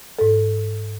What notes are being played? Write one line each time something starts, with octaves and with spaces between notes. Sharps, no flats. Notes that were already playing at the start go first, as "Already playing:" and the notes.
G#2 A4